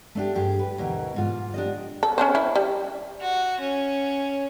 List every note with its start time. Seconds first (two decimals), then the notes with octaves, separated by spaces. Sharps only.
0.15 A3 D4 G4
0.35 G2 G4 G#4
0.59 B4
0.78 D2 B2 E3 A#4
1.16 G#2 F4
1.54 D4 G4 D#5
2.03 A4
2.18 C#4 D4 C5
2.35 E4
2.56 G3
3.21 F#4
3.61 C#4